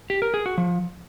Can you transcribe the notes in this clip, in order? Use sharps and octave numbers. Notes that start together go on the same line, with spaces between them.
G4
A#4
G#4
F#4
F3